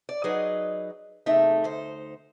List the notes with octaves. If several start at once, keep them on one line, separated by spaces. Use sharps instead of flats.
D5
F#3 D#4 G#4 B4 D#5
E2 A2 C3 A3 D#4 E5
D2 D#4 C5